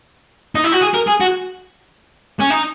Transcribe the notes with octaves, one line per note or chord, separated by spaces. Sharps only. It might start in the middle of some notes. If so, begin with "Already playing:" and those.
D#4
E4
F#4
G#4
A#4
G#4
F#4
C#4
D#4